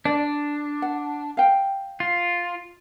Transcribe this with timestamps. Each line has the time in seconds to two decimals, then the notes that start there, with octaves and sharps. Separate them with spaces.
0.05 D4 D5
0.82 F#5
1.37 F5 G5
2.00 F4